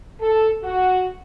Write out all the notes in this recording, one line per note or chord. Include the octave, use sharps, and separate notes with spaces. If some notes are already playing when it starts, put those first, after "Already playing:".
A4
F#4